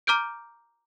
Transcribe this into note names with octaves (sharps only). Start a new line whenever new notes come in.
A#5 D6 F6 G6 D7